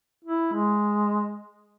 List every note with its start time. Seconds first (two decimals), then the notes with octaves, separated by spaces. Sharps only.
0.24 E4
0.53 G#3